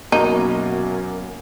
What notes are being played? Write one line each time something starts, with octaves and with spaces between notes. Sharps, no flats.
F#2 B2 A#3 D#4